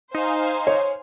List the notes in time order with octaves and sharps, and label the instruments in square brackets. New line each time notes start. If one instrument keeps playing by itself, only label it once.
[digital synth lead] D#4 [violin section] C5 F5 G#5
[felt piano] C#5